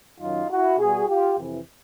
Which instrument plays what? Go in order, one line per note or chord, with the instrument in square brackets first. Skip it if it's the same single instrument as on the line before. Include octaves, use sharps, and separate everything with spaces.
[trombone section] F#2 D#3 F#3 D#4 F4
E4 F#4
B2 G3 F#4 G#4
F4 G4
F2 C3 E3